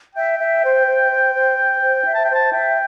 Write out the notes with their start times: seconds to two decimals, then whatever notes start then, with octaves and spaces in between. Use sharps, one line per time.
0.15 E5 G5
0.39 E5
0.63 C5
0.86 C5
1.10 C5
1.34 C5
1.58 C5
1.81 C5
2.05 E5
2.14 A5
2.24 C5 G5
2.35 A5
2.52 E5 G5